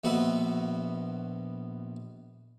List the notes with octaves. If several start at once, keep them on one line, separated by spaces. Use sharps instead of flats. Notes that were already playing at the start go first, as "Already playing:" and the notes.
A#1 B2 F#4 B4 E5